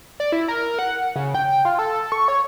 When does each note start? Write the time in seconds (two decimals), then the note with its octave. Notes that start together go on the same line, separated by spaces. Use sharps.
0.20 D5
0.32 E4
0.48 A#4
0.79 F#5
1.16 C#3
1.35 G5
1.65 F4
1.79 A4
2.12 C#6
2.28 C#5